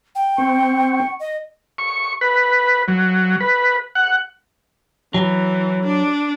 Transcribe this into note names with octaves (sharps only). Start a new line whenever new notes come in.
G5
C4 C#6
D#5
C#6
B4
F#3
B4
F#5
E3 F#3
D4